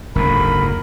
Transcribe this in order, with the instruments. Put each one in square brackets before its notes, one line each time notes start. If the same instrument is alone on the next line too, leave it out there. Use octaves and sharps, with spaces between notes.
[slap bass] F#1 D2 G#2 [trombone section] A#4 [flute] B5